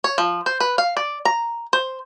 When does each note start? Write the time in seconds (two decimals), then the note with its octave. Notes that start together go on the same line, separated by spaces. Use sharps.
0.04 C#5
0.18 F3
0.46 C5
0.60 B4
0.78 F5
0.97 D5
1.25 A#5
1.73 C5